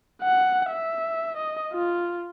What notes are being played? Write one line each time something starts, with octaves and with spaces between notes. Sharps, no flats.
F#5
E5
D#5
F4